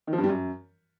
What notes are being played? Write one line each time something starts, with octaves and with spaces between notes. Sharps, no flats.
D#3
F3
G2
G3
F#2